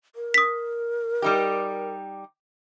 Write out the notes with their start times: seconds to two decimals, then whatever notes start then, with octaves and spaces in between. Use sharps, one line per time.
0.15 A#4
0.34 D#6 B6
1.22 G3 D#4 G4